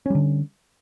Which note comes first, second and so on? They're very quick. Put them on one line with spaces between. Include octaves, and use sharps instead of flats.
C#4 G3 D3